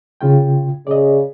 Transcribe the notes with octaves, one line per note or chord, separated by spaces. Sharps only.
C#3 F4 G5
C#3 D5 D#5